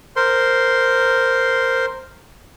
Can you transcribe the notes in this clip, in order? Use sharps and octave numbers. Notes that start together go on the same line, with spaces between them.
A#4 C5 C6